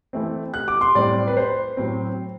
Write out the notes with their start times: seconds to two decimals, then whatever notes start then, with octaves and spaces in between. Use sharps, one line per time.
0.13 E3 A3 C4
0.54 F#6
0.68 D6
0.81 C6
0.95 A2 G3 C4 D5
1.28 B4
1.37 C5
1.77 A2 F#3 C4